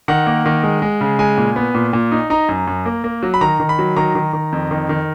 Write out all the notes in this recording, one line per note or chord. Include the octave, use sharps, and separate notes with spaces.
D#3 F#5
A#3
D#3
G#3
G#3
C#3
G#3 G#5
A#2
B3
A#2
A#2
D#4
D#4 A#5
F#2
F#2
A#3
A#3
F#3
B5
D#3 A#5
D#3
B5
F#3
D#3 A#5
D#3
D#3
F2
D#3
D#3